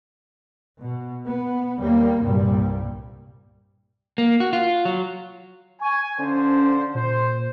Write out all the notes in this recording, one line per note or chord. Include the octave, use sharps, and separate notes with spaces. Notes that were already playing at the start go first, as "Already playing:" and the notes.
B2
B3
D#2 G3 A#3
C2 G2 A#2 G3
A#3
F#4
F4
F#3
G#5 C#6
D3 F3 C#4 C5
A#2 C5